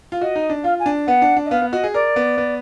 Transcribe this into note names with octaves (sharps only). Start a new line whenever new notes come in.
F4
F#4 D#5
D#4
D4
F4 F5
G#5
D4
B3 F#5
D4
D4
D#5
B3 F5
B3
F#4 D#5
G#4
A#4 D5
B3
B3